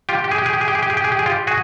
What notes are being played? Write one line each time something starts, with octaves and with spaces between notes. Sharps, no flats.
F4 G4
G4
G#4
G4
G#4
G4
G#4
G4
G#4
G4
G#4
G4
G#4
G4
G#4
F4 G4
F#4 G#4